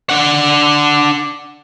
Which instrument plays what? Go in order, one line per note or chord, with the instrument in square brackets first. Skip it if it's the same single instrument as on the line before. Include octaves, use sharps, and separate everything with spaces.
[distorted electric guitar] D4 F#5